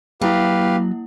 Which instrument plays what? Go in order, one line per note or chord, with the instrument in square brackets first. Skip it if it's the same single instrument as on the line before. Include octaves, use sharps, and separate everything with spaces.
[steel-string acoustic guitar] F#3 [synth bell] A#3 E4 [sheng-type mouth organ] G4 B4 F5